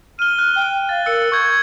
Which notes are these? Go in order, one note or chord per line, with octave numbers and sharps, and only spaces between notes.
F6 D#7 G7
F#6
G5
F5 A6
A#4 E6 C#7
C#6 G6 G#6